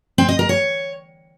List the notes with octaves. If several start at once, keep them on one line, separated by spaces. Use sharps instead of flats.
C4
D#5
A#4
C#5